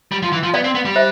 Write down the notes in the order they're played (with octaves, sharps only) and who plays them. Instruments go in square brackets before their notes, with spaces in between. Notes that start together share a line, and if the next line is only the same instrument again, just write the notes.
[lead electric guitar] G3
F3
E3
F3
[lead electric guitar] B3 [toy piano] D5 F5
[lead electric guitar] C4
B3
G3
[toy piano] C5 E5